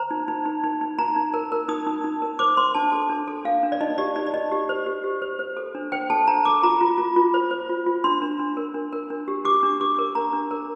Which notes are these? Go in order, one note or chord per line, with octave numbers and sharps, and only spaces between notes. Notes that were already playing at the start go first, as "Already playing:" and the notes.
Already playing: C5 A#5
D#4
D#4
D#4
D#4
D#4
D#4 A#5
D#4
A#4
A#4
D#4 D#6
D#4
D#4
A#4
C5 D6
C5 C6
D4 A5
A4
D4
A4
D4 F5
D4
D5
D#4 D#5
G4 D5
D#4 D5
D5
D#4 D#5
G4
C5
G4
G4
C5
C5
A4
D4
C5 G5
A4 A5
D4 A#5
A4 D6
F4 A#5
F4
F4
F4
C5
C5
F4
F4
D4 C6
D4
D4
A#4
D4
A#4
D4
G4
G4 D6
D4
G4 D6
A#4
D4 A#5
D4
A#4